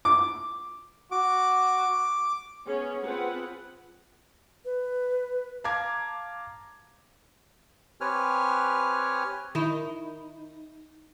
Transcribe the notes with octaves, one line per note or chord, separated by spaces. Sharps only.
D6
F#4 D6
B3 C#4 G#4
C4 F4 G#4 B4 F#5
B4
F5 A5 A#5 D6 G#6
C4 G4 B4 C#5 G#5 F6
D#3 D#4 E4